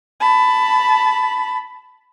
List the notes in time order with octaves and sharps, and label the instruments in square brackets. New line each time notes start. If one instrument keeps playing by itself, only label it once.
[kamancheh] A5 B5